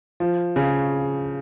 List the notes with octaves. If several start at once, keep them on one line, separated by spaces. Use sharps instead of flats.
F3
C#3